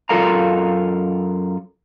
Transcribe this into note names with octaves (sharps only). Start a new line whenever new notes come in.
F#2 F4 A4 A#4 F5 A#5